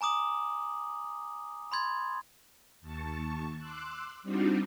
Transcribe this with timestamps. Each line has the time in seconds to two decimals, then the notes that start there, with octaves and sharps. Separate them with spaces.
0.01 G#5 A#5 D6 D#6 F#7
1.72 B5 C6 G#6 A6
2.81 D#2 A5 C#6
3.59 C6 D6 E6 F#6
4.23 G3 C4 D4 D#4 F4 F#4